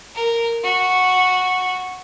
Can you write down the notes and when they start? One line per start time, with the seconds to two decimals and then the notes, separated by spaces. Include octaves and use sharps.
0.15 A#4
0.63 F#4